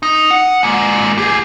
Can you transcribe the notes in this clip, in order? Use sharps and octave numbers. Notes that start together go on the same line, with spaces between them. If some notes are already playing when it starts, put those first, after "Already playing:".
D#4
F#5
G#3 A#3
G4 G#4